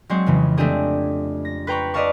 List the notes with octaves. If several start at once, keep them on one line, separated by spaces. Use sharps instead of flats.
F#3 G#3 C4 C5 C#5
F2 C#3 E3
G#3 A3 C4 D4 G4 G#4
A#6
B4 C5 G5 A#5 B5 C#6
B4 D5 D#5 F5 A5 C#6